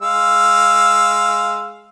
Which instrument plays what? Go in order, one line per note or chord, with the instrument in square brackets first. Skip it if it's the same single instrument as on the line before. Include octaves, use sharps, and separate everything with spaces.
[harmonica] G#3 F5 E6